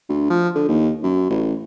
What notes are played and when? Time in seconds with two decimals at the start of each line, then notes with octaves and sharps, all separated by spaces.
0.09 D2
0.30 F3
0.55 D3
0.69 D#2
1.03 F#2
1.30 A1